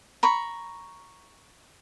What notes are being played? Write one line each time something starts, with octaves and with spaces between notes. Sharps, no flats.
A#5 B5 C#6